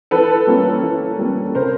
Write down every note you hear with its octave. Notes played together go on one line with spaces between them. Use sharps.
E3 A4 B4
G3 A#3 C#4
E3
G3 A#3 C#4
C3 A#4 C5